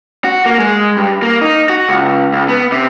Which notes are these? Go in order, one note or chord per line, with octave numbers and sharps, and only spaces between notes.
F#4
A#3
G#3
G2
A#3
D#4
F#4
C#2
C#2
B3
C3